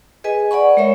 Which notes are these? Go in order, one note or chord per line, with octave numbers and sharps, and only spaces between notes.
G#4 B4 D#5 G#5
D5 F#5 B5 C#6
G#3 A#4 C#5 E5